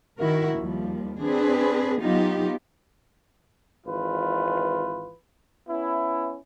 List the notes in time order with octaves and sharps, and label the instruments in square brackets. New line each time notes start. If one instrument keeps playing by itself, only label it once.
[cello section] D#3 E4 F#4 A#4
D#2 F3 G3
C4 D4 G#4 B4
F#3 B3 D#4 F4 G4
[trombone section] G#1 E3 F4 B4
B3 C#4 E4